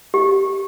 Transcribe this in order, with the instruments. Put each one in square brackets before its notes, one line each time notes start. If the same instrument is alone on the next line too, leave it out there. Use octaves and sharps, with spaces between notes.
[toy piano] G4